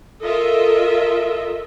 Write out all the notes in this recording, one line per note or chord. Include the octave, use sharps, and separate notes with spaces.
F4 A4 A#4 D#5 E5